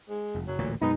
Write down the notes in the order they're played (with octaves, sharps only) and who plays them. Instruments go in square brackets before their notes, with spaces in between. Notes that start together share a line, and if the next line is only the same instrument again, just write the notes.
[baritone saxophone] G#3
[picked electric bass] F1
[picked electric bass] F#1 [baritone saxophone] F#3
[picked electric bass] A1 D2 A#2
[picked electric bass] F#2 B2 G#3 [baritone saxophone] B3 [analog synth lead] D#4